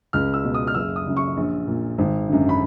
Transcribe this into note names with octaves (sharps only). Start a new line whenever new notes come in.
C#2 F6
E6
B2
D#6
F6
F#1 E6
D#6
F#2 C#3
C#6
A#1
A#2
G#1
F#2 D3
B5